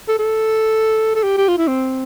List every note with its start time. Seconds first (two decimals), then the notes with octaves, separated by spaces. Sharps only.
0.08 A4
0.19 A4
1.15 A4
1.23 G4
1.38 G4
1.48 F4
1.58 E4
1.68 C4